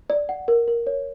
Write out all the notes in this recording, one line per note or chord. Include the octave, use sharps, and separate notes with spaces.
D5
F#5
A#4
A#4
C#5